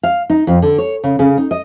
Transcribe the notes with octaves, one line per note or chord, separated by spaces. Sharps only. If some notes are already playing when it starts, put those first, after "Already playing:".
F5
D#4
F2
D3
C#5
C#3
C#3
D#4
D#5